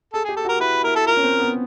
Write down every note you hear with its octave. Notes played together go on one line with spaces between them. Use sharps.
G#4 A4
G4 G#4
A4
F#4
A#4
E4 B4
E4 A#4
A4
F4 A#4
C#4
C4
B3